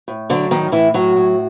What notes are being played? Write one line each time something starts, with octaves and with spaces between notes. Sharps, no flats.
A2
D3 F#3 D4
A2 D#3 D#4
A2 E3 E4
A2 F#3 F#4
A2